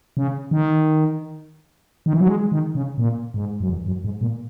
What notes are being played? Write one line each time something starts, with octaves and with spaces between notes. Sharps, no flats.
C#3
D#3
D#3
E3
F#3
G#3
D#3
C#3
A#2
G#2
F#2
E2
F#2
G#2
A#2